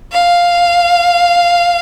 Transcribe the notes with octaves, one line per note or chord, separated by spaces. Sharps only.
F5